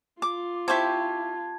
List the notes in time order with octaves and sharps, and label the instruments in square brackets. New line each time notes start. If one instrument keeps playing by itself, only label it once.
[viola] F4 [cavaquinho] D6
[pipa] C4 G4 [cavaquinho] E4 C#6 D6 [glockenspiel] A5 G#6